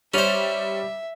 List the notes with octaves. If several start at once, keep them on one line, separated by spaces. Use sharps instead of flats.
G3 C#4 C5 E5 F7